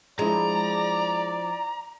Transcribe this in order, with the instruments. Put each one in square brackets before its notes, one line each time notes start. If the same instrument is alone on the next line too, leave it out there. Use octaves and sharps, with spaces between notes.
[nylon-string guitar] F3 D4 E4 [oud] G#3 [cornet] D5 [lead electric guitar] A#5